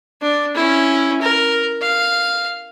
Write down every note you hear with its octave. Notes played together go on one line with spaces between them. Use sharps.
D4
C#4 E4
A#4
F5